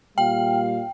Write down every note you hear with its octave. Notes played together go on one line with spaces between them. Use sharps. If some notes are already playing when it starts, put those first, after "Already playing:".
A#2 G3 F5 G5